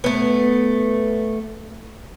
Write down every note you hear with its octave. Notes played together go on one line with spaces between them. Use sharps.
A3 B3